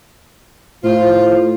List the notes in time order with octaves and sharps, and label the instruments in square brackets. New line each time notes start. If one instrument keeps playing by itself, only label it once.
[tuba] A2 [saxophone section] F4 [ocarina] C5